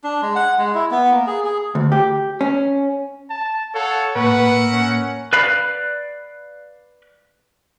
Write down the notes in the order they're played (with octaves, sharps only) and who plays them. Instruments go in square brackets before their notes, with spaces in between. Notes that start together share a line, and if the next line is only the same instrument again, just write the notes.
[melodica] D4
G#3
F#5
G#3
E4
B3
A#3
G#4
G#4
[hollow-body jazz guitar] D2
G4
C#4
[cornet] A5
[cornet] A4 [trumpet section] C#5 F5 F#5
[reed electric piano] A2 A#3 C#6 [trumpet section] A#4 E5 F#5 [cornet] B4
[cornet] C#4
[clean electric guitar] B4 D5 F5 B5